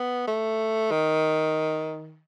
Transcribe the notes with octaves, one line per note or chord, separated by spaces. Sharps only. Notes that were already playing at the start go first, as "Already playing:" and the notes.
Already playing: B3
A3
D#3